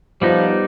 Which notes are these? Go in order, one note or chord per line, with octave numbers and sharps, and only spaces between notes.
F3 G3 B3 D#4